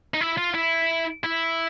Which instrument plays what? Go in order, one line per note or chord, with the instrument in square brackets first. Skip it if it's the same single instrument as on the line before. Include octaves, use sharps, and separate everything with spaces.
[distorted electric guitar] D#4
E4
F4
E4
E4